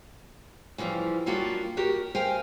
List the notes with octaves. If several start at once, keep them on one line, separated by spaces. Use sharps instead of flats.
C#3 E3 F3 G3
F#3 G3 A#3 D4 F4 F#4
F#4 G4 A#4
A#4 C5 F5 G5 G#5